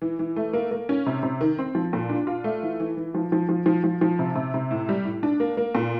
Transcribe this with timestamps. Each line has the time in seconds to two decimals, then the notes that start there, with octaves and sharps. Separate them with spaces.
0.02 E3
0.19 E3
0.36 A3
0.53 A#3
0.71 A#3
0.89 C#4
1.06 C3
1.23 C3
1.41 D#3
1.59 C4
1.75 F3
1.93 A#2
2.09 D4
2.27 F4
2.44 A3
2.63 E3
2.80 E3
2.97 E3
3.14 F3
3.32 F3
3.49 F3
3.66 F3
3.84 F3
4.01 F3
4.19 C3
4.35 C3
4.54 C3
4.71 A2
4.89 G3
5.05 A2
5.23 D4
5.40 A#3
5.57 A#3
5.75 A#2